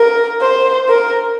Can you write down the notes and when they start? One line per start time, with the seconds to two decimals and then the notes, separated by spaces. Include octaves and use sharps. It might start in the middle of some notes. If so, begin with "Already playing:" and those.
Already playing: A#4
0.41 C5
0.89 A#4